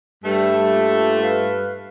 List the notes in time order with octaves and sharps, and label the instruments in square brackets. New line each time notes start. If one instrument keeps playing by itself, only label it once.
[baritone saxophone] G2 [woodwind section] D3 G3 [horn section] A3
[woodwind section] A#3 F4
B4 F5